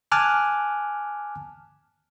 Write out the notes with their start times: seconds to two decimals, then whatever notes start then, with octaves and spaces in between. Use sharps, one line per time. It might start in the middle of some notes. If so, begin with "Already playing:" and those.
0.12 G#5 A5 D6 F6 F#6